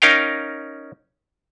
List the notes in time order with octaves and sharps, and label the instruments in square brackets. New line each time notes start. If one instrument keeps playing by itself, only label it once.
[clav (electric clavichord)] C#4 D#4 A#4 F5 G5